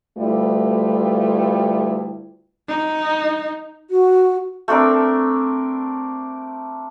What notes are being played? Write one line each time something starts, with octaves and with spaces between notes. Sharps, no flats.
D2 G3 A3 E4 F4 B4
D#4
F#4
A3 C4 D4 A#4